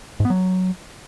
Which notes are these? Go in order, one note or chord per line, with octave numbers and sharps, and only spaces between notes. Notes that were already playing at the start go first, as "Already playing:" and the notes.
G#2
B3
F#3